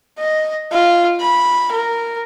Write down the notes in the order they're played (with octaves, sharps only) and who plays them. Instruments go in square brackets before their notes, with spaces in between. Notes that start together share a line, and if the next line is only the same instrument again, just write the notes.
[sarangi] D#5
F4
B5
A#4